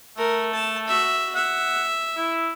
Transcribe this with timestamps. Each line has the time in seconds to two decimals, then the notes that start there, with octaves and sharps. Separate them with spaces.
0.17 A3 A#4
0.54 A5
0.88 F#4 E5
1.35 E5 F#5
2.17 E4